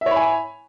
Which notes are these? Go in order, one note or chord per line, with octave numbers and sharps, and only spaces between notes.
C#5 E5 G#5 B5